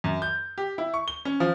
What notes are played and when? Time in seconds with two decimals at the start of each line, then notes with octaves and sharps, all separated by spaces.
0.04 F#2
0.22 G6
0.58 G4
0.78 E4
0.94 C#6
1.08 G7
1.25 C#4
1.40 F3